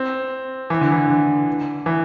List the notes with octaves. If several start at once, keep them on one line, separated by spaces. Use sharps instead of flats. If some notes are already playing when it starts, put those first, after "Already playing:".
Already playing: C4
E3
D3
E3
D3
E3